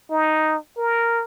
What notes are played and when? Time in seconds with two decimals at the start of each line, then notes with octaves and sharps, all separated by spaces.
0.10 D#4
0.77 A#4